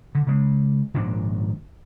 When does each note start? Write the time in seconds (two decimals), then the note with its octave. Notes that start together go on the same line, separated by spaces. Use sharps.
0.15 D3
0.27 C#3 G#3
0.94 G#1 A#2 F3 D4